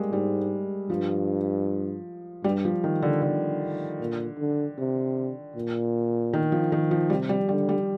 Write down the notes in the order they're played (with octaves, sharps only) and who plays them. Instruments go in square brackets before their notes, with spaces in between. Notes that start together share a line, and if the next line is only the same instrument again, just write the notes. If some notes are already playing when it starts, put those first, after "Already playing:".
Already playing: [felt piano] G3 G#3 A#3
[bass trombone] G#2 [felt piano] G3
[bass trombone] G2 [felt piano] F3
[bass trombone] G2 [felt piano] G3
[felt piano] F3
D#3
D3
D3
[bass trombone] A#2
D3
C3
A#2
[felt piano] D#3
F3
D#3
F3
[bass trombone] C3 [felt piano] G3
[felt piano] G3
[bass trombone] D3 [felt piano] G3
[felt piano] G3